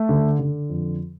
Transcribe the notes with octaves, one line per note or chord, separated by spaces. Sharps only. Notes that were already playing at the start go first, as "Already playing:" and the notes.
Already playing: A3
D3
D3
F2